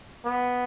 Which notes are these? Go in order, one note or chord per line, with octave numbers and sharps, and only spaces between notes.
B3